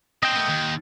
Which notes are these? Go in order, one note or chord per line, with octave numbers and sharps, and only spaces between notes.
C4 D4 D#5 G5
A3 B3
D#2